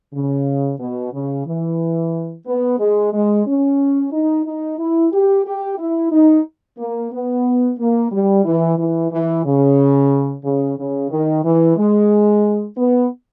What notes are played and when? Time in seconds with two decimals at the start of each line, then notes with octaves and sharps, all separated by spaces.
0.14 C#3
0.80 B2
1.13 C#3
1.46 E3
2.47 B3
2.79 G#3
3.13 G#3
3.47 C#4
4.12 D#4
4.46 D#4
4.79 E4
5.12 G4
5.45 G4
5.78 E4
6.12 D#4
6.78 A#3
7.13 B3
7.79 A#3
8.12 G3
8.45 E3
8.78 E3
9.12 E3
9.45 C#3
10.44 C#3
10.78 C#3
11.10 D#3
11.44 E3
11.77 G#3
12.77 B3